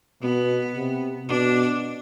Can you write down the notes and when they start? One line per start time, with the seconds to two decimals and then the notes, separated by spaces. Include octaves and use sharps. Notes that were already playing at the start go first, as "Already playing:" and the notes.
0.22 B2 B3
0.75 C3
1.29 B2 D4